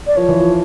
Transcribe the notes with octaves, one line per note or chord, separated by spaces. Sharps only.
D5
F3 C#5
E3
F3